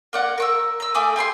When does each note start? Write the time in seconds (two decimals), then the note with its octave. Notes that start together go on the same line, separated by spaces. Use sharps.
0.13 A#3 D5 F#5
0.38 A#4 C#6 E6
0.80 A#5 E6
0.94 A3 G#5 D6 D#6
1.16 G4 G#4 B5 C6